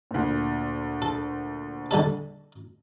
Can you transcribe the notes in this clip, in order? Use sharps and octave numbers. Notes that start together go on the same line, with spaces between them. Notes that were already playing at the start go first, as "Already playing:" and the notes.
D2 A#2
A4
D3 G3 A4